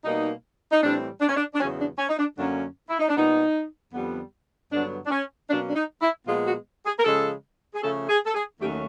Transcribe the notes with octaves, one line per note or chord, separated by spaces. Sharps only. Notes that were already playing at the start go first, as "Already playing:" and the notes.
B2 G3 A#3 D#4
D#4
A2 E3 G3 C4 D4
D4
C#4
D4
D4
E2 C#3 F#3 C#4
D4
C#4
D#4
D4
F#2 D3 F#3 A#3 C#4 D4
E4
D#4
D4
A#2 G3 B3 D#4
F2 D3 G3 B3
G2 D3 F#3 B3 D4
D4
C#4
B2 F#3 A#3 C#4 D4
D4
D#4
E4
A#2 F3 G#3 B3 F4
F#4
G#4
A#4
C#3 F3 G#3 A4
G#4
C#3 F3 A3 C#4 A4
G#4
A4
G#4
D#2 D#3 F#3 A3 C#4 G4